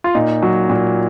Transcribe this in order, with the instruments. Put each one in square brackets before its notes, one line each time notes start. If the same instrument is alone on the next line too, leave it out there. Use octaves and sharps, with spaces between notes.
[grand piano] F4
A#2 D#4
F#3
A#2